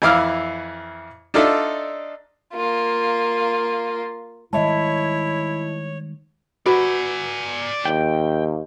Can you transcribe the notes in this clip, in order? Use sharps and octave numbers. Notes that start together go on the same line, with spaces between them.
F2 E3 E4 F5 D6 F6
D4 D#4 F4 A4 D5 E5
A#3 F4
D#3 G3 G#3 E4 C#5 D#5 E5 A5
F#4 B4 D5 G#5
D#2 G5